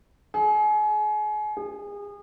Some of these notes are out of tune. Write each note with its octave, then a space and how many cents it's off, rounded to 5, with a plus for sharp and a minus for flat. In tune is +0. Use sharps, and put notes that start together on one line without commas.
G#4 +35
G#4 -30